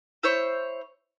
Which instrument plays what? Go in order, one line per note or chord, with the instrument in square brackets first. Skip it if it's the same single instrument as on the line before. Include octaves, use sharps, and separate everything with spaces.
[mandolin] E4 C5 C#5